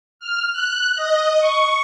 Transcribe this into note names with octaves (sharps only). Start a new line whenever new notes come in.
F6
F#6
D#5
C#6